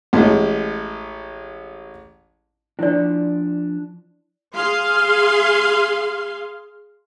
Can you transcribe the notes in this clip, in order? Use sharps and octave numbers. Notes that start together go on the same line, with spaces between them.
A1 G#3
F3 D4 E4 D5
G#4 F5 C6